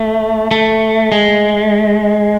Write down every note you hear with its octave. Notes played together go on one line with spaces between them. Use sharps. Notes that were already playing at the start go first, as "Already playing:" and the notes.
Already playing: A3
A3
G#3